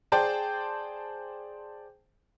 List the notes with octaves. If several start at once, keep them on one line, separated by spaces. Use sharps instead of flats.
G#4 C5 D5 G5 A5